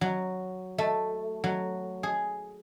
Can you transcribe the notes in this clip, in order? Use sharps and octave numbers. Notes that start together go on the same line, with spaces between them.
F#3
A3
F#3
G#4